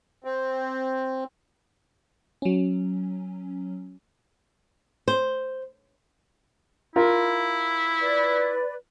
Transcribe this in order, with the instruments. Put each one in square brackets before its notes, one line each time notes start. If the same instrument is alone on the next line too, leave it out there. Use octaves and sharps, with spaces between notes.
[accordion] C4
[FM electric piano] F#3 C#4
[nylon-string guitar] C5
[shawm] E4 [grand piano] F4 A#4
[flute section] B4 D5